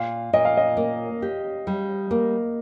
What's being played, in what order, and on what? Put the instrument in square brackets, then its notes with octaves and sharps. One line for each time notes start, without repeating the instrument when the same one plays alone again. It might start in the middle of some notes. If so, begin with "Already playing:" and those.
Already playing: [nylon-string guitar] A#2 [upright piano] F5
[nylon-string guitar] A#2 [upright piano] D#5
[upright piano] F5
D#5
[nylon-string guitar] A#3
G4
G3
A#3